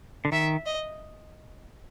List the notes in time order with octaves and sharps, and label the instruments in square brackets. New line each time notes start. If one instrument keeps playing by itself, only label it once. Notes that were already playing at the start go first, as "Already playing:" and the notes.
[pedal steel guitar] D3
[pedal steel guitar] D#3 [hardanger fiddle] E5
[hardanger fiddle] D#5